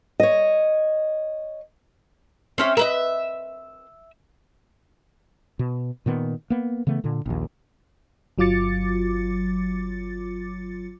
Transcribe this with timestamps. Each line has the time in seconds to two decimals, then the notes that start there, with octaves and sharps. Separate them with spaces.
0.20 C#5 D#5
2.58 C4 C#4 E5
2.77 A#4 B4 D#5 E5
5.59 B2
6.06 A#2 D#3 B3
6.50 A#3 B3
6.87 C#3 E3 A3 B3
7.04 A#2 D3
7.26 A#1 D#2
8.38 G1 F#3 F4 D6 A6 C#7